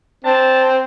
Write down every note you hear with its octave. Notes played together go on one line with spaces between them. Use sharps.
C4 D4 A5